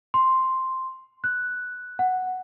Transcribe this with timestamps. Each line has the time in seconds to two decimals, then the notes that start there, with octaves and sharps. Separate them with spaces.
0.14 C6
1.24 F#6
1.99 F#5